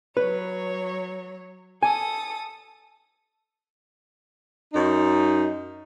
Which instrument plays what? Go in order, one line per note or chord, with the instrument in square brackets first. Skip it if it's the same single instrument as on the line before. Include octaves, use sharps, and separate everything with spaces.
[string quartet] F#3 C#5 [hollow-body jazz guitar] B4
[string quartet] A4 D#6 [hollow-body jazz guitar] G#5
[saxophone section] F#2 D#4